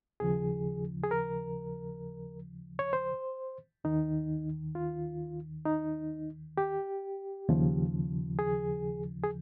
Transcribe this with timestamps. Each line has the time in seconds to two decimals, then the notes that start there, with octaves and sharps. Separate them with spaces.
0.20 D#2 C#3 F3 G#4
1.04 G#4
1.11 A#4
2.79 C#5
2.93 C5
3.84 D#2 D#3 D#4
4.75 F4
5.66 D#4
6.58 G4
7.49 D#2 C#3 F3
8.39 G#4
9.24 G#4